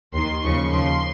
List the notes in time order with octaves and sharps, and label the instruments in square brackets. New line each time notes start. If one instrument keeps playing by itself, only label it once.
[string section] D#2 D#3 C6
D#2 C#3 F3 C#6
D#2 C#3 F3 C6